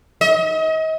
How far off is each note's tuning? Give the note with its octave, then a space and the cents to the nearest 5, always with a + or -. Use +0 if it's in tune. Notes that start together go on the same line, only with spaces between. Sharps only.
D#5 +35